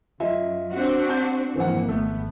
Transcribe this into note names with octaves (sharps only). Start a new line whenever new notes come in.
F#2 F4 D#5 E5
C4 D4 F#4
A5 G6
G#1 F2 E3 A#3 C4 F#5
G#1 A3 B3